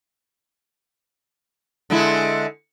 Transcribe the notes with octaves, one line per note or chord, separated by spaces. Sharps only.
D3 G#3 E4